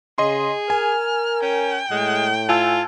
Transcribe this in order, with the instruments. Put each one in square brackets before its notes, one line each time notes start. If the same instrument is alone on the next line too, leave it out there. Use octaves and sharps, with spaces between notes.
[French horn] C#3 [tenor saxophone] G#4 [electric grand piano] D#5 C6
[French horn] A#4 [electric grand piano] G#5 [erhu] F6
[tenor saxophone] C#4 [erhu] G5
[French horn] A2 [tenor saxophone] G#3
[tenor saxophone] F4 [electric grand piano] G#5 A5 E6